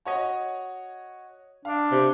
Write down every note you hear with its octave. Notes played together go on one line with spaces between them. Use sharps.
F#4 C#5 D#5
D4 F5
C3